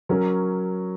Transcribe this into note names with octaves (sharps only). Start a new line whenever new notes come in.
F#3 C#4 A#4